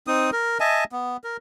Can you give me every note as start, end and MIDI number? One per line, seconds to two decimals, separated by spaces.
0.07 0.30 60
0.07 0.30 63
0.07 0.30 87
0.33 0.58 70
0.60 0.84 75
0.60 0.84 76
0.60 0.84 80
0.60 0.84 81
0.92 1.17 59
1.24 1.37 70